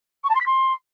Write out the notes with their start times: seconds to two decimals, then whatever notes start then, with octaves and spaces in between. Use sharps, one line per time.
0.23 C#6
0.29 A5
0.35 C6
0.40 B6
0.46 C6